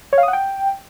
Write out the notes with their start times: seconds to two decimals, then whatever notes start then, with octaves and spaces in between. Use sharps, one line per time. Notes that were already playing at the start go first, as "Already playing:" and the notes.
0.13 C#5
0.18 F5
0.23 D#6
0.28 F#5
0.33 G5